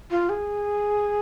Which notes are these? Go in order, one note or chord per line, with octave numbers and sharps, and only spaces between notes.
F4
G#4